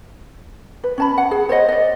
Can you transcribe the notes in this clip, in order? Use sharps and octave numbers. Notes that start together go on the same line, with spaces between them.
B4
C#4 A5 B5
F#5
G#4
C5 C#5 D#5 F#5
D5 D#5